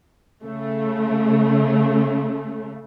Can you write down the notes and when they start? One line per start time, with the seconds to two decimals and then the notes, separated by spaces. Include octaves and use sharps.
0.44 C#3 A3